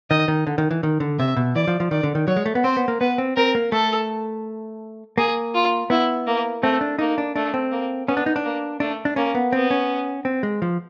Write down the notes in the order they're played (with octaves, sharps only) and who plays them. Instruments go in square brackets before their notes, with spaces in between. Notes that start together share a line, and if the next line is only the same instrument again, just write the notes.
[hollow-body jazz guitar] D#3 [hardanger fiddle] D#5
[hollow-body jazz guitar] D#3
D3
D#3
E3
D#3
D3
[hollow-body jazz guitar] C3 [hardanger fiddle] E5
[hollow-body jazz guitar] B2
[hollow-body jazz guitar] E3 [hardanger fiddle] D5
[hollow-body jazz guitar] F3
F3
[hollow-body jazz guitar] D#3 [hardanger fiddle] D5
[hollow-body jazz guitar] D3
D#3
[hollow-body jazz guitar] F#3 [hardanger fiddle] C#5
[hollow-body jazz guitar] G#3
A3
B3
[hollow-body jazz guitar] C4 [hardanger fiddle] C5
[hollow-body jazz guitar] B3
A#3
[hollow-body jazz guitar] B3 [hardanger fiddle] B4
[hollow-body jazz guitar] C4
[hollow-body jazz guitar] C4 [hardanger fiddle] A#4
[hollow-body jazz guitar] A#3
[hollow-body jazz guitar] A3 [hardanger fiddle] A4
[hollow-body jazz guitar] A#3 [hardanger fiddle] G#4
[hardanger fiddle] F4
[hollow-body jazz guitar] B3 [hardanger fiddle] E4
[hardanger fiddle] A#3
[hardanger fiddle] A3 [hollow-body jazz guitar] C4
[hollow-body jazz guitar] D4
[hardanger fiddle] A#3 [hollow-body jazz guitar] D#4
[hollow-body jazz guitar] D4
[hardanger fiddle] A3 [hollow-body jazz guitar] D4
[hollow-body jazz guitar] C4
[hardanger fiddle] A#3
[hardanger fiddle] B3 [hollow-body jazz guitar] C#4
[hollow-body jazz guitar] D4
D#4
D4
[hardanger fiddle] A#3
[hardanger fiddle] A3 [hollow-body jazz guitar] D4
[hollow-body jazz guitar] D4
[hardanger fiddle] A#3 [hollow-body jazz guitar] C#4
[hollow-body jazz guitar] B3
[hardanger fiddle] B3 [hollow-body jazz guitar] C4
[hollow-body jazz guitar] C#4
C4
G#3
F3